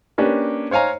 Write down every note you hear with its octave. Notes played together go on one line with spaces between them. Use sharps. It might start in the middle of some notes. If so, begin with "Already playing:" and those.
A#3 C#4 D4 G4 B4
C5 C#5 F5 G#5 A#5